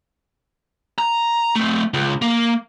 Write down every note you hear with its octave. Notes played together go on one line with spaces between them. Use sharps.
A#5
A3 C4
C#2
A#3